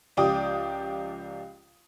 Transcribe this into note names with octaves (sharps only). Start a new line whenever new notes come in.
C#2 F3 G4 D5 G5 D#6